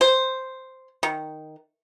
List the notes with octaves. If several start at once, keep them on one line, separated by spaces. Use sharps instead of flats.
C5
D#3